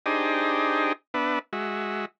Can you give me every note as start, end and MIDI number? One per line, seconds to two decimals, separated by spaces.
0.06 0.93 62
0.06 0.93 63
0.06 0.93 67
0.06 0.93 68
0.06 0.93 72
0.06 0.93 75
1.14 1.39 59
1.14 1.39 62
1.14 1.39 71
1.14 1.39 76
1.53 2.05 56
1.53 2.05 66
1.53 2.05 76